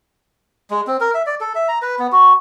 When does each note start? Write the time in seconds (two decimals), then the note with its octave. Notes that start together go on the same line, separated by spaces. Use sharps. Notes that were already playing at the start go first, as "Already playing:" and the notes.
0.70 G#3
0.87 C4
1.00 A#4
1.14 E5
1.26 D5
1.41 A4
1.55 E5
1.68 A#5
1.82 B4
1.99 B3
2.12 F#4